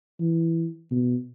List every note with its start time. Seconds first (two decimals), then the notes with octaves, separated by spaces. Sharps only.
0.20 E3
0.91 B2